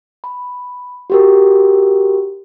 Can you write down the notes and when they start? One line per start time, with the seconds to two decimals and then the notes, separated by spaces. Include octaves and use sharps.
0.24 B5
1.10 F#4 G4 A#4